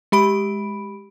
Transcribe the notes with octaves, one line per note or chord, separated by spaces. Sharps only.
G#3 G4 B5 D7